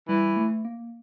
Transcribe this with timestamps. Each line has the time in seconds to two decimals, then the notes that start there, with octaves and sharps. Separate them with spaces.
0.08 E3 G3
0.37 A3
0.65 A#3